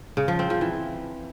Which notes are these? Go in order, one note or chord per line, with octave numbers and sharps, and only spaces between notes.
C#3
F3
C4
F3
E3